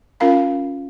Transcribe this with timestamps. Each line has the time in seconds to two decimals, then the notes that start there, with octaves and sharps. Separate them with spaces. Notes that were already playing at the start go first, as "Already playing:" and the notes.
0.20 C#4 F4 A#4 F5 B5